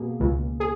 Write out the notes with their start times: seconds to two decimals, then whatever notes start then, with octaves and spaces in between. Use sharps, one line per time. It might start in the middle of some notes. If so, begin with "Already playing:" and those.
Already playing: B2 A#3 G#4
0.20 C#2
0.60 G#4